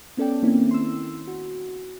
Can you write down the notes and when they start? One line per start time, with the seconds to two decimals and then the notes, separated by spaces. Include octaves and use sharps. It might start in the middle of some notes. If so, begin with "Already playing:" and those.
0.17 B3 C#4 A4 D5 G5
0.42 D#3 A#3 C4 C#4 E4
0.71 C6 E6
1.28 F#4